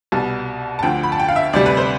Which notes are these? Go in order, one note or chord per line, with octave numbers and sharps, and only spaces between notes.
C2 B2 G3 A5
A5
D2 D3 F3 G5
B5
A5
G5
F5
E5
D2 C3 G3 D5
B4
C5